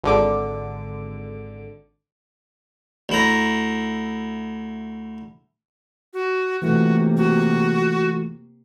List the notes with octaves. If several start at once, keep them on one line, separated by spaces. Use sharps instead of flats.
G#1 D3 D6
D2 E4 A#5
F#4
C3 E3 A3 A#3 F4 F#4
F#4